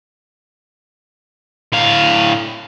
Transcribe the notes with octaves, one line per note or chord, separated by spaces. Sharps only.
A2 F5